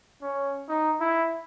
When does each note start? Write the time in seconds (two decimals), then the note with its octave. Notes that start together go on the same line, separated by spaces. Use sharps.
0.22 C#4
0.69 D#4
1.01 E4